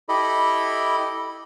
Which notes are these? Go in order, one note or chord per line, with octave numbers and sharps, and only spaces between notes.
E4 G4 A4 D#5 B5